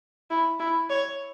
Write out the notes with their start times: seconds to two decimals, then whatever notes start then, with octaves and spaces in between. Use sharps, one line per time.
0.30 E4
0.60 E4
0.90 C#5